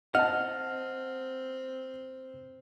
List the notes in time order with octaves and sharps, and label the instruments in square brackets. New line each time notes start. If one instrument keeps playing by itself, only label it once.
[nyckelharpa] C4 [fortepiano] D#5 A5 [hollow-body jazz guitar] F#5 [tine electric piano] F6